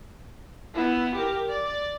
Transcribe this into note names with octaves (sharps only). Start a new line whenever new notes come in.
B3 E4
G4 A#4
D5